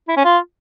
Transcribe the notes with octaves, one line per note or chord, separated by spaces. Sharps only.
E4
C#4
F4